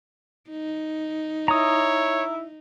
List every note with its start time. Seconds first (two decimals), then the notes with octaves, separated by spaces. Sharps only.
0.50 D#4
1.48 E4 C#5 A#5 D#6